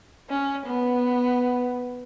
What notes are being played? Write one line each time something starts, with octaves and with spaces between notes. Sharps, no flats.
C#4
B3